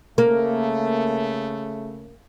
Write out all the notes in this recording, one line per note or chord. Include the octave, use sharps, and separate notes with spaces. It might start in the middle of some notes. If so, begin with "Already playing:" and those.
C#3 A3 A#3